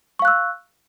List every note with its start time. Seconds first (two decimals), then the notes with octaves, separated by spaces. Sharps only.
0.19 C#6
0.22 F5
0.25 F#6
0.28 E6